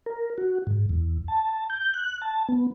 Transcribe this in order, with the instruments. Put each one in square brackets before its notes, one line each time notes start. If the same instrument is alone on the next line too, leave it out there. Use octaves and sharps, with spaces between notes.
[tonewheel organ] A#4
F#4
G#2
E2
A5
G6
F#6
A5
B3